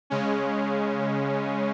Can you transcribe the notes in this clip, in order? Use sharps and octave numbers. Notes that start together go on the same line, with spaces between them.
C#3 G#3 C#4